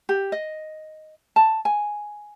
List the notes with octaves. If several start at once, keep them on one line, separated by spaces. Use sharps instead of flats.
G4
D#5
A5
G#5